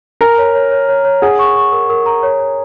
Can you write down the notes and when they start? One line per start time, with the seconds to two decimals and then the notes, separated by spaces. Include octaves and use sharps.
0.21 A#4 G#5
0.38 C#5
0.55 C#5
0.71 C#5
0.89 C#5
1.05 C#5
1.22 G#4 F#5
1.39 C#6
1.56 C#6
1.72 A#4
1.90 A#4
2.06 A#5
2.23 C#5
2.40 C#5